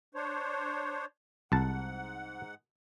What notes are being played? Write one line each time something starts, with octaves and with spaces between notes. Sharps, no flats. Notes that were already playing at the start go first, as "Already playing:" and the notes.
D4 C5 C#5
C2 G#2 F#5 A5